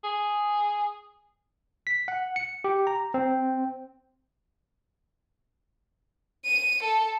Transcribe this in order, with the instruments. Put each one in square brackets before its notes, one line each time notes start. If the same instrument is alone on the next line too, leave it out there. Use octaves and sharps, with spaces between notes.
[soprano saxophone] G#4
[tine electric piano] B6
F#5
C#7
G4
A#5
C4
[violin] D#7
A4